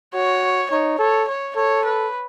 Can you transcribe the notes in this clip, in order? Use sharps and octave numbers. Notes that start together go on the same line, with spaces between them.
F#4 C#5
D#4 C#5
A4 C#5
C#5
A4 C#5
B4